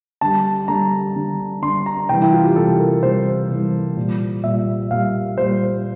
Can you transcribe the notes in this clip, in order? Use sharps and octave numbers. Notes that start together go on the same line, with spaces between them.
D3 G3 A5
D3 G3 A#5
D3 G3
D3 G3 C6
A#5
C3 E3 G3 G5
E4
F4
G4
C3 E3 G3 A4
A#4
C3 E3 G3 C5
C3 E3 G3
A#2 G3
A#2 G3 E5
A#2 G3 F5
A#2 G3 C5